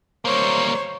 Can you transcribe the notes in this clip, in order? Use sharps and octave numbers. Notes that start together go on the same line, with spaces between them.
G3 A#3 C5 C#5